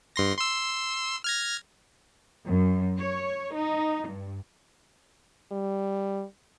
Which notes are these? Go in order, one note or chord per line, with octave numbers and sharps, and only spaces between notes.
G2 C6 A#6
C6 E6
F6 G#6 A#6
F#2
C#5
D#4
G2
G3